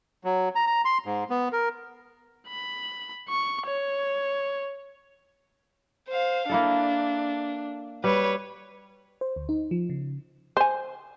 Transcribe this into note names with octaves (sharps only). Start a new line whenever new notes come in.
F#3
A#5
A#5
C6
G#2
B3
A#4
B5
C#6
C#5
C5 F5
A#3 D4 E4 A4
G3 B4 C#5
C5
D2
D#4
F3
C#3
C5 G#5